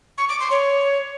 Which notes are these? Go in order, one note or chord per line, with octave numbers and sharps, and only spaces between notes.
C#6
D6
C6
C#5